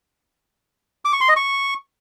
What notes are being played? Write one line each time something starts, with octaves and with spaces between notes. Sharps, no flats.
D6
C#6
C6
D#5
C#6